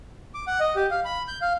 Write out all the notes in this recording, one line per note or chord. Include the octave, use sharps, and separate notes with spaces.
D6
F#5
D#5
G4
F5
B5
G6
F5